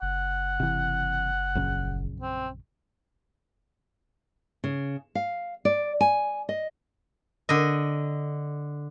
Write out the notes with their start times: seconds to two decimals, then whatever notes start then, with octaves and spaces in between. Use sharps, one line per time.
0.02 F#1 F#5
0.60 C3 E3
1.55 A#1 F#2 C#3
2.21 C4
4.64 C#3
5.15 F5
5.65 D5
6.01 G#5
6.49 D#5
7.49 D3 D#5